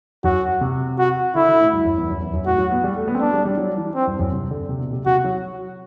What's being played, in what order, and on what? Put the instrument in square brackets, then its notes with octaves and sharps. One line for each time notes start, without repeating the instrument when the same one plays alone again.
[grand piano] F#2 [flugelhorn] F#4
[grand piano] C3
[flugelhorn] F#4
[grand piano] D3 [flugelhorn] E4
[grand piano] D3
A2
G2
F#2
E2
F#2
E2
F#2
[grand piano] A2 [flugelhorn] F#4
[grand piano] F#3
B3
G3
A3
B3
C4
[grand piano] B3 [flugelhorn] D4
[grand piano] G3
G3
F#3
E3
[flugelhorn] C4
[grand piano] G2
F#2
C3
D3
C3
B2
C3
[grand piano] C3 [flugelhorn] F#4
[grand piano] F#3